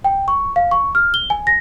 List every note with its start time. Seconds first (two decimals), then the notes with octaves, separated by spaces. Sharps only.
0.04 G5
0.28 C#6
0.56 F5
0.71 C#6
0.95 F6
1.14 G7
1.30 G#5
1.47 A#6